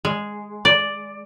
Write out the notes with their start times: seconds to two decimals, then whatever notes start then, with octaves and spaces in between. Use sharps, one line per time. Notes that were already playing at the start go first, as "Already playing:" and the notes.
0.05 G#3
0.65 D5